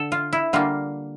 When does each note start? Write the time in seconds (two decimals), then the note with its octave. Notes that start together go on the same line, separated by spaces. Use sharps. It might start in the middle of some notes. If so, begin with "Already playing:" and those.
Already playing: D3 A4
0.12 F4
0.33 E4
0.53 D3 G3 A#3 F4